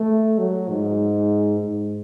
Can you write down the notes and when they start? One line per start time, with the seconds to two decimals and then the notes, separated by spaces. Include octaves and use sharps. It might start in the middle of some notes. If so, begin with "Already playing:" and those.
Already playing: A3
0.39 F#3
0.69 G#2
1.60 G#2